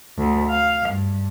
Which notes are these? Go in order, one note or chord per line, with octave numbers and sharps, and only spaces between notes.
D2
F5
G2